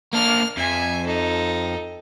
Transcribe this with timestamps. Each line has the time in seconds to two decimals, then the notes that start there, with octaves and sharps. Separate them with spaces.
0.13 A#3 D4 F6
0.57 F2 E5 G#5
1.05 D#4 A4